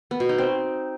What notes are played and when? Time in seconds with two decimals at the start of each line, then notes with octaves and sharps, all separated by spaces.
0.11 B3
0.20 B2
0.29 D#4
0.38 C4